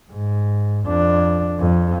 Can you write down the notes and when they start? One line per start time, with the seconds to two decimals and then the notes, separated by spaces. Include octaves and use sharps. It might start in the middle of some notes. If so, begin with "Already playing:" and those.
0.11 G#2
0.87 F2 D4
1.59 F2